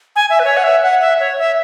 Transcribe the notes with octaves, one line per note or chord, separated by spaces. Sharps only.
G#5
E5
B4
C#5
F#5
E5
F#5
E5
C#5
E5